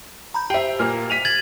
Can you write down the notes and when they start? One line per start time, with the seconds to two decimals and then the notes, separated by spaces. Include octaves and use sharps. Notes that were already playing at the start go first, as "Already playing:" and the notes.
0.34 A#5 B5 G6
0.50 G4 C5 E5 G5
0.79 A#2 A#3 F6
1.10 B6 D#7 F7
1.25 G#6 A6 F#7